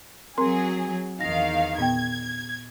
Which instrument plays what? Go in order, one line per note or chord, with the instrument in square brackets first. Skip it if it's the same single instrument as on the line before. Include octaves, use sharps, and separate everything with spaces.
[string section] F#3 G#4 [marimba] C4 A#4 C6
[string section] E2 D#3 F5 [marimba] A#6
[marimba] A#2 B3 G5 [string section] G#6